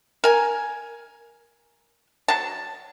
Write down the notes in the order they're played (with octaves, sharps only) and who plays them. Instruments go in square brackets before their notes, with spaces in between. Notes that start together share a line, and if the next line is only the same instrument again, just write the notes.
[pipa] A#4 G#5
F#3 A5